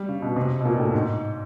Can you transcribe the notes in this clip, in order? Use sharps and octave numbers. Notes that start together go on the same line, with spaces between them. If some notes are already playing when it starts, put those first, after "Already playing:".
Already playing: G3
C#3
B2
C3
B2
A#2
A2
G#2